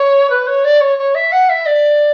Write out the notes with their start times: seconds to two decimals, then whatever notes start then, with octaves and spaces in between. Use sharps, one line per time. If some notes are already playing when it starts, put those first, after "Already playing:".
Already playing: C#5
0.30 B4
0.47 C#5
0.64 D5
0.80 C#5
0.98 C#5
1.15 E5
1.31 F#5
1.49 E5
1.66 D5